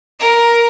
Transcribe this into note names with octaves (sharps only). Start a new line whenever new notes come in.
A#4